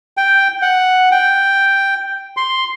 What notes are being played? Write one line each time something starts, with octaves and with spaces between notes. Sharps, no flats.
G5
F#5
G5
C6